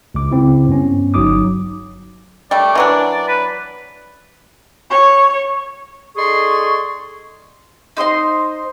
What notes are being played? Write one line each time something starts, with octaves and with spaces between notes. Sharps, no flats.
C#2 D6
C#3 C4 E4
G2 B3 C#4
G1 F#3 D#4 D6 D#6
G3 A3 D5
E3 F#3 D4
B4
C#5
D#4 G#4 A4 D5 C6 C#6
D#4 C5 D#5 C6